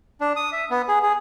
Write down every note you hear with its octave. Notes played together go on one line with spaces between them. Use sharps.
D4
D#6
E5
B3
G#4
G#4